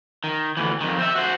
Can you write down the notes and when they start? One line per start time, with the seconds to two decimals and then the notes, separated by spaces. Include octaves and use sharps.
0.24 D#3
0.57 D2 E3
0.81 F2 D#3
0.98 C4 E5
1.15 F#4 C5